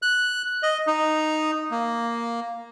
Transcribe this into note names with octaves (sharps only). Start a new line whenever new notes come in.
F#6
D#5
D#4
A#3